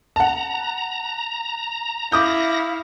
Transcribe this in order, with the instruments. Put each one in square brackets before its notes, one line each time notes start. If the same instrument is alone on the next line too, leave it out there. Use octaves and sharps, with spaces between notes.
[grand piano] F#5 A5 [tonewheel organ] A#5
[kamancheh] E4 F5 [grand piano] D6 D#6 G6 [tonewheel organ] A#6